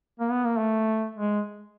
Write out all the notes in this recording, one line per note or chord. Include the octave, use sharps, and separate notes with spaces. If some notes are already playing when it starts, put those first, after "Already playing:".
A#3
B3
A#3
A3
G#3